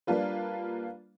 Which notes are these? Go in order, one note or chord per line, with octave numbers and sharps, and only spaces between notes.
G3 A#3 D4 F4 B4